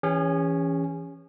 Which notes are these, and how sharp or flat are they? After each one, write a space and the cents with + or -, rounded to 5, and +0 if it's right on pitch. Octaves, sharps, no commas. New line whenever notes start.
E3 +5 C#4 +0 G#4 -40